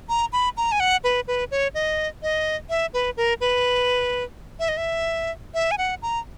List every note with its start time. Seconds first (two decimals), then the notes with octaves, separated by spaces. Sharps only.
0.09 A#5
0.33 B5
0.57 A#5
0.72 G#5
0.80 F#5
1.04 B4
1.28 B4
1.51 C#5
1.75 D#5
2.23 D#5
2.70 E5
2.94 B4
3.17 A#4
3.41 B4
4.59 E5
4.69 D#5
4.77 E5
5.54 E5
5.71 G#5
5.78 F#5
6.02 A#5